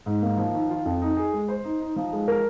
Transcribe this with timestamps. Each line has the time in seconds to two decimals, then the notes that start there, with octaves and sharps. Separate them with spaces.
0.06 G#2
0.22 A#3
0.38 F3
0.54 D#3
0.70 F4
0.85 F2
1.02 D#4
1.17 G#4
1.33 G#3
1.48 C5
1.64 D#4
1.80 D#4
1.96 F3
2.13 G#3
2.28 A#4